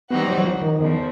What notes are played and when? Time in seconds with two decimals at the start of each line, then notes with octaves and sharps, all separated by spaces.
0.10 E3 G3 B3 C4 D#4 F#4
0.28 F#3
0.38 F#3
0.45 F3
0.62 D#3
0.79 E2 C#3 F3